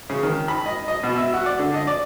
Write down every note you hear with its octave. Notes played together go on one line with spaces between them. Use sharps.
C#3
D#3
B5
D#5
D#5
B2
E5
F#4
D5
D3
D#5
D5